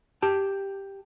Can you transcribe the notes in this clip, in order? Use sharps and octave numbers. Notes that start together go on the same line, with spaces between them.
G4 A5